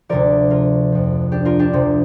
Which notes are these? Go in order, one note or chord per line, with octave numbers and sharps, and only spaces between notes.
D2 C3 F3 A#4 D5
F4 A#4
F2 F3
D4 G4
F4 A#4
D4 G4
D2 C3 F3